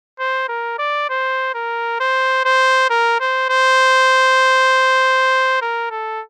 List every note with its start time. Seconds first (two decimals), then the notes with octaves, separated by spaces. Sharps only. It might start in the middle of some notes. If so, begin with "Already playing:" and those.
0.19 C5
0.49 A#4
0.79 D5
1.10 C5
1.55 A#4
2.00 C5
2.45 C5
2.90 A#4
3.20 C5
3.50 C5
5.61 A#4
5.91 A4